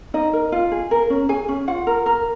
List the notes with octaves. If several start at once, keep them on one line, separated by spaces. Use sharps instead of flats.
D#4 D#5
A#4
F4
G#4
A#4
C#4
G#4 G#5
C#4
F4 F#5
A#4
A#4